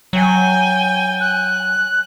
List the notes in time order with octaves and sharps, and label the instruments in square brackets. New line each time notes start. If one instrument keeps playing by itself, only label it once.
[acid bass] F#3 [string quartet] G5 G#5
[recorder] F#6